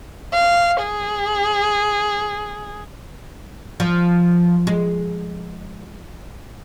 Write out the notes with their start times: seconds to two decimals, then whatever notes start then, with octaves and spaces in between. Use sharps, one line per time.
0.34 F5
0.82 G#4
3.80 F3
4.67 G#3